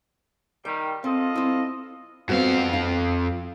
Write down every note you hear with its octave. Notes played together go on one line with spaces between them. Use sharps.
D#3 G3 G4 G5
C4 F4 A4 D#5
C4 E4
F2 B3 C4 F#4 F5
F4